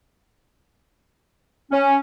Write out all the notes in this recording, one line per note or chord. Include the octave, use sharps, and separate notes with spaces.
C#4